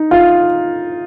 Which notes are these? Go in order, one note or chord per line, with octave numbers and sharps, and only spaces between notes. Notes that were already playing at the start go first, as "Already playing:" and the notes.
Already playing: D#4
F4